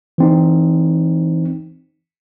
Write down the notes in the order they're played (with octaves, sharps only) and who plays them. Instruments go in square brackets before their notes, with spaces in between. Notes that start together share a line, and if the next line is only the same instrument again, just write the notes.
[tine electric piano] E3 C4 D#4